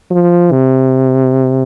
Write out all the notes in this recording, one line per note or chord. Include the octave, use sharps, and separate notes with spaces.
F3
C3